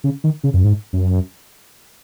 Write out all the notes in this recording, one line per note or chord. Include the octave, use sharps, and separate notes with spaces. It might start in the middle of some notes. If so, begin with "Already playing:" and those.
C#3
D#3
C#3
F#2
G#2
F#2